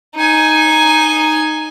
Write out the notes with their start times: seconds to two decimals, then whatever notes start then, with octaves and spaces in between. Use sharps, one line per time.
0.16 D#4 G#5